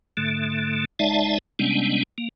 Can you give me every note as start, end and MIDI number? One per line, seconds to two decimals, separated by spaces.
0.17 0.85 44
0.17 0.85 50
0.17 0.85 57
0.99 1.38 30
0.99 1.38 56
0.99 1.38 63
0.99 1.38 74
0.99 1.38 76
0.99 1.38 81
1.59 2.03 48
1.59 2.03 55
1.59 2.03 56
1.59 2.03 59
1.59 2.03 61
1.59 2.03 62
2.18 2.29 58